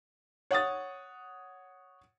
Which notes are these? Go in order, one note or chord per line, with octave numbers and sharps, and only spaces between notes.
C#5 F#5 D#6 A6